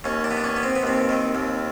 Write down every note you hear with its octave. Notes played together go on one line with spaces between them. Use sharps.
D#2 C#4
D4
B3
D4
C#4
B3
C4
B3
D#2 C4
D#3
D#2